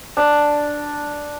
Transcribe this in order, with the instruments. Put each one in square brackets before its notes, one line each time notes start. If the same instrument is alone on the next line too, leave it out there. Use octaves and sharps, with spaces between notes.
[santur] D4